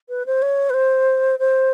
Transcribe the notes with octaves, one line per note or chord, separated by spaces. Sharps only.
B4
C5
C#5
B4
C5
C5